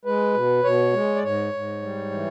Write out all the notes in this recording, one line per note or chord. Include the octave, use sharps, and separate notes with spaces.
G#3 B4
B2
B2 C#5
G#3
D5
G#2 C#5
G#2
G3
E3